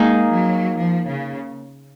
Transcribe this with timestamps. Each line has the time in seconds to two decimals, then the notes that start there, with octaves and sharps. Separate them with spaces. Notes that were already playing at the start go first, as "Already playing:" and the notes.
Already playing: G#3 A#3 D#4 G#4
0.33 F#3
0.78 F3
1.08 C#3